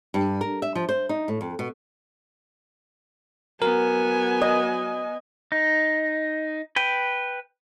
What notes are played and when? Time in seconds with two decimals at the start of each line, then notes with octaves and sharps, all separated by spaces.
0.14 G2
0.41 A#4
0.62 E5
0.75 F3
0.89 C5
1.09 D#4
1.28 A2
1.41 F2
1.59 B2
3.62 F#3 B3 A#4 G#5
4.41 D#5
5.52 D#4
6.76 B4 G5